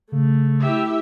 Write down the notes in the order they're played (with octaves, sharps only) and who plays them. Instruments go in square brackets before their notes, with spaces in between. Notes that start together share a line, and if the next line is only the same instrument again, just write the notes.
[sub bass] C#3 [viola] A3
[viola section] E4 G4 E5